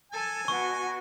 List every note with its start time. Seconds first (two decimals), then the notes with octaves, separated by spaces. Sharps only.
0.12 A4 G#5 A5
0.48 B2 F#4 C#6